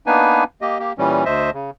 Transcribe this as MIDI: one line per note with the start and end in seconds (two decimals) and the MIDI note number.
0.07 0.44 58
0.07 0.44 59
0.07 0.44 62
0.07 0.44 63
0.07 0.44 71
0.07 0.44 80
0.61 0.78 58
0.61 0.78 67
0.61 0.78 75
0.79 0.93 58
0.79 0.93 67
0.98 1.24 46
0.98 1.24 52
0.98 1.24 55
0.98 1.24 61
1.25 1.50 38
1.25 1.50 72
1.25 1.50 75
1.25 1.50 76
1.54 1.71 49